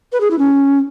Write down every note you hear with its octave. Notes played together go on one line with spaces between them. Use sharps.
B4
G#4
E4
C#4